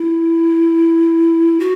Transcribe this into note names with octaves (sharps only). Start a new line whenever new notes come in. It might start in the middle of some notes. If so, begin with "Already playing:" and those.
Already playing: E4
F#4